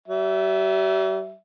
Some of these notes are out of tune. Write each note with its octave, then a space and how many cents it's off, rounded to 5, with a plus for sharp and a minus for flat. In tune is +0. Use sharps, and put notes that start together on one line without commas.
G3 -45 E5 +0